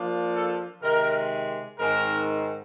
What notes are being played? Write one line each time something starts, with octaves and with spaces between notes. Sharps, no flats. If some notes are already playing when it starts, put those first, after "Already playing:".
Already playing: F3 A#3 D4
A4
C3 D#3 G#3 A#4
G#2 D#3 G#3 C4 A#4